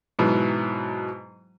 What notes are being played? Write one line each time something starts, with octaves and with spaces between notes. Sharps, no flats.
G#2 B2 E3 F#3